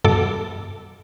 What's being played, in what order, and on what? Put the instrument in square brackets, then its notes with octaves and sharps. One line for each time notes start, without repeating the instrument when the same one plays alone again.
[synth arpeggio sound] G2 B2 A4 D6